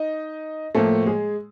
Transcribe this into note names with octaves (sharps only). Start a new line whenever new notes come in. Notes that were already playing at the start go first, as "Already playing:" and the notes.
Already playing: D#4 D#5
A2 F3 A3 A#3 A4
G#3 G#4